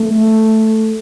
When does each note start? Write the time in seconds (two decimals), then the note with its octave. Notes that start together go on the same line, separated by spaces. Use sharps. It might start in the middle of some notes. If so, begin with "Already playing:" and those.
Already playing: A3